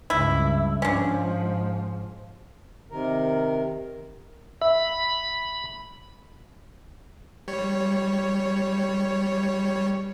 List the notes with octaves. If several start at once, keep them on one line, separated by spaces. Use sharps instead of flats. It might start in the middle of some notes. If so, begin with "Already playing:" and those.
C#2 G2 E4
G#2 F3 C#4 D4
C3 D#3 A#4
E5 B5
G3 C#5